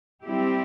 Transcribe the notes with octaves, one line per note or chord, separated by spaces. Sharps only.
G3 C4 E4 G4